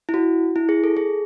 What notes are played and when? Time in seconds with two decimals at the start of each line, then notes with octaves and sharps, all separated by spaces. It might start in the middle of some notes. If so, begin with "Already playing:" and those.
0.09 E4
0.14 F#4
0.56 E4
0.69 G#4
0.84 A4
0.97 G#4